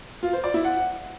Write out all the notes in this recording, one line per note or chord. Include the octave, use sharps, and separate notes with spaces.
F4
C5
D5
E4
F#5